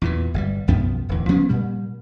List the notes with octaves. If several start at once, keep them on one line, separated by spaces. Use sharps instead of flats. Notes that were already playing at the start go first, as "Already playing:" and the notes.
E2 A#2 E3
G1 D3 G3
B1 F#2 F3 B3
D1 E2
F3 B3 C#4
A#2 G3